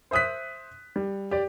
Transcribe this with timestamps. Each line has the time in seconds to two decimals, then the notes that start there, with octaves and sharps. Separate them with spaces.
0.11 C5 E5 D#6 F#6 B6
0.96 G3
1.31 G4 D5